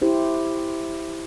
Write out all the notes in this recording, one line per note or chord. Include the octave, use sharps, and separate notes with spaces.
E4 G4 C5